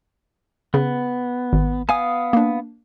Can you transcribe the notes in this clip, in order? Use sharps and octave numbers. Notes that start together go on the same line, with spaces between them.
C#3 B3
G#1
B3 F5 G#5 D#6
A#3 D4